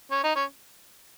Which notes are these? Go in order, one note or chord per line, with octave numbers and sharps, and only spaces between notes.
C#4
D#4
C#4